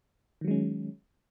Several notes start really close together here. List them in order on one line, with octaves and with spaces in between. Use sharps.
D#3 F#3 G#3 C#4